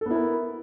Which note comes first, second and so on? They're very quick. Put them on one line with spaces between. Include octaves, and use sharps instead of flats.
A4 B3 E4 A#4